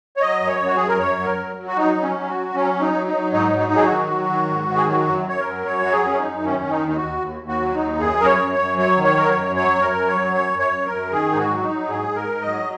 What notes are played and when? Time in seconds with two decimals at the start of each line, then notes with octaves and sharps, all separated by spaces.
0.17 C#5
0.21 F#3 D#5
0.41 F#2
0.47 C#5
0.60 F#2
0.65 F#4
0.76 F#2 G#4
0.88 A#4
0.99 F#2 C#5
1.19 F#3
1.24 A#4
1.38 F#3
1.57 F#3
1.68 F#4
1.76 F#3 D#4
1.96 F#3
2.03 C#4
2.15 F#3
2.28 F#4
2.35 F#3
2.55 F#3 C#4
2.74 F#3
2.81 D#4
2.93 F#3
3.07 D#4
3.14 F#3
3.32 G#2 D#4
3.52 F#3
3.59 D#4
3.72 F#3 G#4
3.85 F#4
3.91 D#3
4.11 F#3
4.30 D#3
4.50 G#2
4.69 D#3
4.76 G#4
4.88 F#3 F#4
5.08 F#2
5.27 F#2 C#5
5.40 A#4
5.47 F#3
5.66 F#2 C#5
5.85 F#3 F#4
5.92 G#4
6.06 F#2 C#4
6.18 D#4
6.24 F#2
6.44 D#3 C#4
6.63 D#3
6.70 D#4
6.84 D#2 D#4
6.96 F#4
7.02 D#2
7.22 D#2
7.42 D#2
7.48 F#4
7.61 F#3
7.74 D#4
7.81 D#2
8.00 F#2 G#4
8.19 F#2 A#4
8.26 C#5
8.39 F#2
8.52 C#5
8.59 F#2
8.78 F#3 C#5
8.97 D#3
9.04 C#5
9.16 F#3 A#4
9.30 C#5
9.36 F#2
9.56 F#3 C#5
9.75 F#2
9.81 A#4
9.95 F#2
10.08 C#5
10.15 F#3
10.33 F#2 C#5
10.53 F#2
10.59 C#5
10.73 F#2
10.86 A#4
10.92 F#2
11.12 D#3 G#4
11.32 G#2 D#4
11.38 F#4
11.50 F#3
11.63 D#4
11.70 F#3
11.89 G#2 G#4
12.08 G#2
12.16 A#4
12.28 G#2
12.41 D#5
12.47 F#3